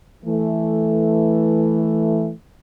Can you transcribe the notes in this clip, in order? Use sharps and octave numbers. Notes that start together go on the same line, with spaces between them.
E3 A3